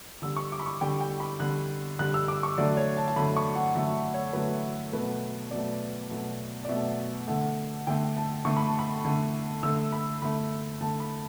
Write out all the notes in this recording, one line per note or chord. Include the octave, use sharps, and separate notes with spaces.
D3 G3 E6
C#6
D6
B5
C#6
D3 G3 G5
G5
B5
D3 G3 F#6
D3 G3 F#6
E6
D6
C#6
D3 F#3 A3 D5
C#5
A5
A5
D3 F#3 A3 B5
C#6
F#5
D3 F#3 A3 E5
C#5
D3 F#3 A3 B4
B2 F#3 A3 B4
B2 F#3 A3 D5
B2 F#3 A3
D5
B2 F#3 A3 E5
D3 A3 F#5
D3 A3 G5
A5
D3 A3 C#6
B5
A5
B5
D3 A3
D3 A3 E6
B5
D3 A3 B5
D3 A3 A5
B5